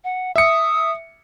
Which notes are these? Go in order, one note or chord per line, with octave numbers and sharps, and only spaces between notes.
F#5
E5 D#6 C#7